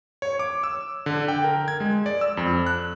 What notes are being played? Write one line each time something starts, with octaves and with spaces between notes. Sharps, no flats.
C#5
D6
E6
D3
G5
A#4
G#6
G#3
D5
E6
F2
F#6